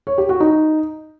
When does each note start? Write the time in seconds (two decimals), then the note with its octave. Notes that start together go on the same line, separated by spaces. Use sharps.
0.07 C#5
0.18 G4
0.29 F#4
0.40 D#4